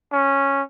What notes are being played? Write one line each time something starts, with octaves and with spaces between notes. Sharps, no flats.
C#4